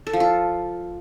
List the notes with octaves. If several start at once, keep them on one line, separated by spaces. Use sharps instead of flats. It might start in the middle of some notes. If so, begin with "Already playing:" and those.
A4
F3
F4